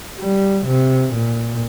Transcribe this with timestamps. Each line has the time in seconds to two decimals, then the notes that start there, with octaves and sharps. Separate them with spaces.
0.20 G3
0.66 C3
1.13 A#2